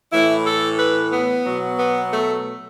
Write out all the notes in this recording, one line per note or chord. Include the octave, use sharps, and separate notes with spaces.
A2 E3 E4
A4
B4
B3
B2 F#3
B3
A3